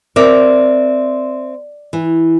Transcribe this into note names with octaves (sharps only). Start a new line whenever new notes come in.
C4 A#4 D5 E5
E3